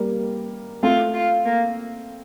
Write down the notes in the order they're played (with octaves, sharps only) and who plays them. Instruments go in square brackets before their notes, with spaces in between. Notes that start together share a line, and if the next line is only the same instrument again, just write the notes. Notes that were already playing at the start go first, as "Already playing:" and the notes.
Already playing: [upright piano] G3 A#3
[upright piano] A3 C4 [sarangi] F4
[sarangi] F4
A#3